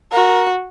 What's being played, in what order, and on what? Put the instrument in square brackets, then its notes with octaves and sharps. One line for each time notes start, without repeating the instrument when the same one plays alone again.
[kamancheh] F#4 [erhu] A#4